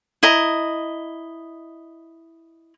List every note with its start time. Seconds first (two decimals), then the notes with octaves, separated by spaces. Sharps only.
0.23 E4 D#5 A#5